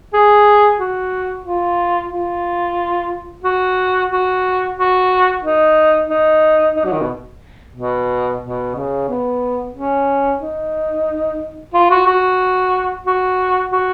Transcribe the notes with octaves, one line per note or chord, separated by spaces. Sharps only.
G#4
F#4
F4
F4
F#4
F#4
F#4
D#4
D#4
D#4
F#3
D#3
B2
B2
B2
C#3
B3
C#4
D#4
F4
F#4
F#4
F#4
F#4